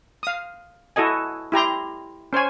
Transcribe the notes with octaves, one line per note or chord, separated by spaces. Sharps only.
F5 D#6
E4 F#4 A4 D#5 G#5
E4 G4 A#5 C6
C#4 C5 C#5 G#5